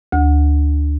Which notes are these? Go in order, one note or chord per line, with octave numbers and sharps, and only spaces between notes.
D2